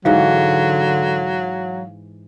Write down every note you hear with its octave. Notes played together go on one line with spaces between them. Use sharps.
G#2 D3 E3 F#3 F#4 F5